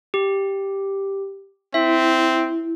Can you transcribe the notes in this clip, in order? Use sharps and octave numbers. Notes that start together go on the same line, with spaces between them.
G4
C4 E4 E5